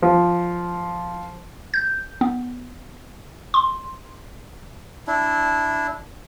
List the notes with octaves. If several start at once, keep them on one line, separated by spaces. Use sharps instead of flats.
F3
G6
B3
C6
D4 E4